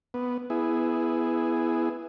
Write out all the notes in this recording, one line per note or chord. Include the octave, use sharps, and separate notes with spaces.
B3
B3 E4 G#4